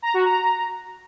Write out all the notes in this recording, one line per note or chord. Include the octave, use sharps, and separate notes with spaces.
A#5
F#4
A#5